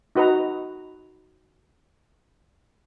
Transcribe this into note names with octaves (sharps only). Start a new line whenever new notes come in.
D#4 F#4 B4 D#5 A#5